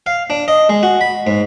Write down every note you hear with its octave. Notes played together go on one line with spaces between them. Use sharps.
F5
D4
D#5
G#3
F#4
B5
G#2